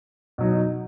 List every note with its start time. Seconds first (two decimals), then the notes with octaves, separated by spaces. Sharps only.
0.38 B2 F#3 D#4